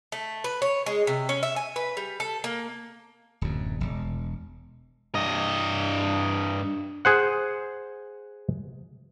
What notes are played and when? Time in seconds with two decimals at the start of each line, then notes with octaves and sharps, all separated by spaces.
0.12 A3
0.44 B4
0.62 C#5
0.86 G#3
1.07 C3
1.29 C#4
1.43 E5
1.56 G#5
1.76 B4
1.97 G3
2.20 A4
2.44 A#3
3.41 D1 F#2
3.80 E1
5.15 G2 D#5
7.05 G#4 C5 F#5